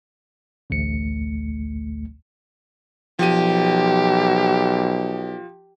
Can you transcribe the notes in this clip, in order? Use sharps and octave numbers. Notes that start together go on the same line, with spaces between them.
A1 D2 A3 C#7
B1 F3 G4 D#7